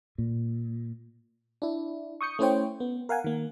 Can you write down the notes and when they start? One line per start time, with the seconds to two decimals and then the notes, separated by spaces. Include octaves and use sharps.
0.18 A#2
1.62 D4 E4
2.21 C#6 D#6 G6 C#7
2.39 A3 C#4 E4 C5 C#5 G5
2.80 B3
3.09 A#4 F5 F#5 G#5
3.24 D#3 A#3